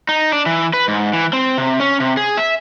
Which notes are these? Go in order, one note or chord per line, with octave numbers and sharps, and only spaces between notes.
D#4
D4
E3
B4
G#2
E3
C4
C3
C#4
C3
G#4
E5